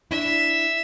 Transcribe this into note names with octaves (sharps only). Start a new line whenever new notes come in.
D4 E4 E5